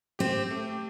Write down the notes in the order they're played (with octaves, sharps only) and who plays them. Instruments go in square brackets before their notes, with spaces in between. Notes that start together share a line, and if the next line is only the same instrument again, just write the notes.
[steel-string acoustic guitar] C4 [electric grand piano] G4
[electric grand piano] A3